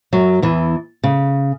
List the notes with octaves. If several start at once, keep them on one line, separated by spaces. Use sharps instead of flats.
F#2 F#3
E2 E3
C#3